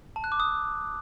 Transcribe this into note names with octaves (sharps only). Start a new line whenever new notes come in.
A5
F#6
D6
D#6